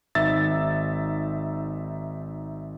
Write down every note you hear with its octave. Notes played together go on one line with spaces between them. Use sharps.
G#1 D#4 E5 E6 A6